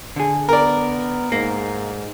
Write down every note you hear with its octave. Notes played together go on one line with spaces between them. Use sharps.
D3 G#4
B3 A#4 D5
G#2 A#3